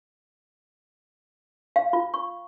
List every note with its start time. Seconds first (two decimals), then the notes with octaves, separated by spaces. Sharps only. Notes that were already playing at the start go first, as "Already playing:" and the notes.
1.76 F5
1.93 F4
2.14 C#6